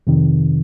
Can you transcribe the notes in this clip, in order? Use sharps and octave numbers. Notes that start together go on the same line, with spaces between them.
F2 C3 D#3